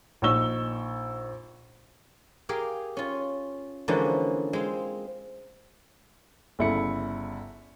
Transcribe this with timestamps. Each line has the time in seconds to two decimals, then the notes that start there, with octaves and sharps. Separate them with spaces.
0.22 A#1 D#4 C#6 E6 G7
2.49 G4 G#4 A#4 F5 G5
2.97 C#4 F4
3.88 D3 E3 F3 G#3 A#3 C#4
4.53 G#3 C4 F5
6.59 G1 C#3 E4 A4 C#7